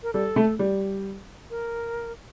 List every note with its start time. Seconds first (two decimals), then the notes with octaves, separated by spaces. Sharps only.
0.03 A#4
0.13 G3 A4
0.36 A3
0.59 G3
1.50 A#4